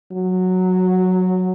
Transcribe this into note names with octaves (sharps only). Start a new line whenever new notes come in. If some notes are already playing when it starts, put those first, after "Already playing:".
F#3